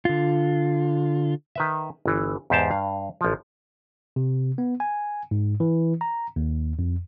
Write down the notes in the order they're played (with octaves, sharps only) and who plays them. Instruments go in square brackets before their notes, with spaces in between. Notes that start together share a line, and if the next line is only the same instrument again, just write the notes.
[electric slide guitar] D3 F4
[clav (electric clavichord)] D#3 B4 E5
G1 E3
E2 G#2 G4 C5 A5
G2 F5
A1 F3
[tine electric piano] C3
B3
G#5
G#2
E3
A#5
D#2
F2